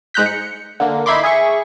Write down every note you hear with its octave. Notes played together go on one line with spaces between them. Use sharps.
G#2 G#3 A#5 F#6 G6 B6
C#7
D3 A#3
D#4 E4 E5 B5 C6 D6
G#4 E5 C#6